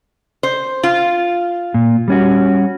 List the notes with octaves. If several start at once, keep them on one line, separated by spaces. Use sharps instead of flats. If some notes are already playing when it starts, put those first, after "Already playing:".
C5
F4
A#2
G3 C#4 F#4